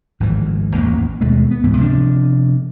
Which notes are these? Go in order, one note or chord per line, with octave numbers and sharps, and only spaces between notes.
G#1 D2 E3 F3
A1 E2 A#3
D#2 B2 G#3 A3
B3
C#2 G#2 E3
C3 F3 D4